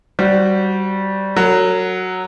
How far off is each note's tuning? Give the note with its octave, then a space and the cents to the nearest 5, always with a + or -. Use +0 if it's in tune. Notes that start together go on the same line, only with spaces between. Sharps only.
G3 -15 F#4 +5 C5 +0
F#3 +0 A#4 -45